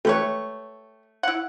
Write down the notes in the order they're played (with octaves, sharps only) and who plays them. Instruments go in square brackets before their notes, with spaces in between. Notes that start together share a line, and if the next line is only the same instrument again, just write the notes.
[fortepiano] A3 [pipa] G4 B4 C#5
[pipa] E4 F#5